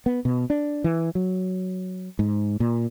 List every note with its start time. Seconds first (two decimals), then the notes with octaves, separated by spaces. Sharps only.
0.06 B3
0.25 B2
0.50 D4
0.84 E3
1.15 F#3
2.19 G#2
2.60 A#2